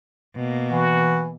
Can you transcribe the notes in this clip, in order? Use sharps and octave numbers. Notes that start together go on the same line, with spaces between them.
B2 A#3
E3 F#4